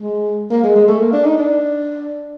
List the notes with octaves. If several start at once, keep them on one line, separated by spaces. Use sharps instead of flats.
G#3
A#3
G#3
G#3
A3
A#3
D4
D#4
D4